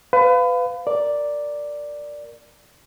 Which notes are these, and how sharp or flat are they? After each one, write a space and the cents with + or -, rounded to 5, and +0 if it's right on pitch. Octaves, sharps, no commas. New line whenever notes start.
B4 +30 F5 +0
A#4 +0 D5 +0